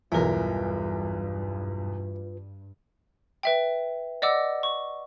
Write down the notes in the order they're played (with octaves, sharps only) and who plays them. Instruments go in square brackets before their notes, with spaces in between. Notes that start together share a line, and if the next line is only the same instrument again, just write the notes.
[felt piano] B1 E2 [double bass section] G2 [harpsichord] E3 A#4 [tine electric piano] F4 B4
[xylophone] B4 E5 G5
D5 D#5 F#5 D6 E6
C#6